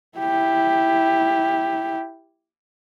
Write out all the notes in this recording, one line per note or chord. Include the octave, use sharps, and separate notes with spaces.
E4 G4